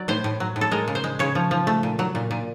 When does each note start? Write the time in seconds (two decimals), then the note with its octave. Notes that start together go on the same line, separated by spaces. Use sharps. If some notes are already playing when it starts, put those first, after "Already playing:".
Already playing: F#3 D5
0.08 A2 C5
0.24 A2
0.40 F#3
0.56 A2
0.61 A4
0.72 G#3 A#4
0.88 C#3
0.95 C5
1.04 G#3
1.19 C#3 C#5
1.35 F3
1.51 F3
1.67 A3
1.83 A#2
1.99 F#3
2.15 A#2
2.31 A#2